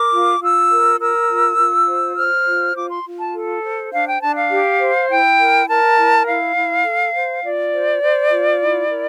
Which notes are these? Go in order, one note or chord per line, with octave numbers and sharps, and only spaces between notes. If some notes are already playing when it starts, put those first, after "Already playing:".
Already playing: A#4 D6
F4
F4 E6
A#4
A#4 E6
F4
F4
C5
C5 F6
F4
F4 D6
C6
F4
A5
A4
C5
D4 F5
G5
D4 A5
F5
G4
C5
E4 G5
A#4
A#4 A5
E4
E4 F5
E4
A4
C5
F4 D5
C5
C5
F4
E4
A#4